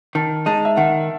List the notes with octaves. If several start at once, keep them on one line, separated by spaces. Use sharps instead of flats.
D#3 A5
G#3 D#4 A5
E5
D#3 F#5